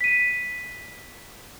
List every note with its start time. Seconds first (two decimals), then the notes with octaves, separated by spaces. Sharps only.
0.01 B6 D#7